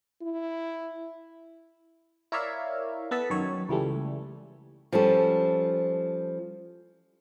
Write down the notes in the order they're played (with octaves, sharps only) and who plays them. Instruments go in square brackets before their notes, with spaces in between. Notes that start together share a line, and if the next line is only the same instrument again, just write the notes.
[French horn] E4
[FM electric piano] E4 A#4 C#5 D5 E5 F5
B3 A4 A5 B6
F#2 D#3 F#3 C#5
C#2 E3 G3 A3
[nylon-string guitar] F3 G3 C#4 A4